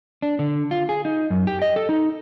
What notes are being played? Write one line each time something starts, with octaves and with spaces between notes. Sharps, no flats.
D4
D3
F4
G#4
D#4
F#2
G4
D#5
A4
D#4